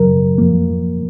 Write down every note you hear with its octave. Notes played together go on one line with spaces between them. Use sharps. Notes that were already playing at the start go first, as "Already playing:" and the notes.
Already playing: F#2 C#3 F#3 A#4
F2 F3 A#3